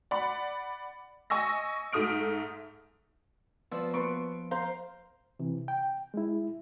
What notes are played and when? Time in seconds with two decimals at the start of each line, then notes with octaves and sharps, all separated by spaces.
0.11 D5 F#5 B5
1.30 D#5 G#5 C#6 E6 A#6
1.93 G#2 A3 D#6 F6 D7
3.71 F3 B3 D5 E6
3.94 A#3 B3 B4 C6 C#6 D7
4.51 C5 F5 A#5
5.39 C3 E3
5.68 G5
6.14 G#3 E4